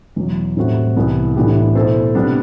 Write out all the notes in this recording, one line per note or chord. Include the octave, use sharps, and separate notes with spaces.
E2 B2 F#3
A2 G3 C4 F#4
C2 C3 E3 G3 B3
A2 E3 B3 D4 G4
B2 A3 E4 A4 C5
C3 G3 B3 D4